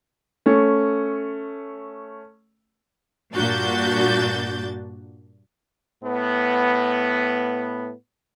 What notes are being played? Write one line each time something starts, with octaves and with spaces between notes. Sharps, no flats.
A3 C#4
G2 A#2 D4 F#4 G6 A6
A2 B3